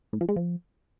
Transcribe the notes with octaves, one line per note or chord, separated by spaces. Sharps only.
A2
F3
G#3
F3